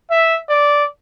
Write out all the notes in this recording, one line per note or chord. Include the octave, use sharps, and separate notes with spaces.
E5
D5